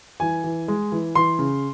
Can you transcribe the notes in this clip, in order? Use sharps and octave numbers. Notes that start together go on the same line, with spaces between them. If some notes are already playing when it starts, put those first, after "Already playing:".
E3 G#5
E3
G#3
E3
E3 C6
C#3